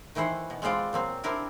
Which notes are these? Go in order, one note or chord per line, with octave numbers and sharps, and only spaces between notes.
D#3 E3 E4 C5 F#5
B2
G#3 B3 C4 F4 D5
A#2 F#3 C4
C4 D4 E4 G4 A#4